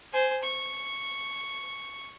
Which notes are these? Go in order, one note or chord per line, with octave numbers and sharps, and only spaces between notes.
C5 G#5
C#6